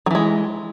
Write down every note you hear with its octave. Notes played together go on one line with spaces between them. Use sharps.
E3 F#3 G#3